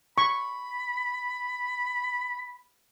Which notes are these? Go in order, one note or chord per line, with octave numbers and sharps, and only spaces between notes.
B5 C#6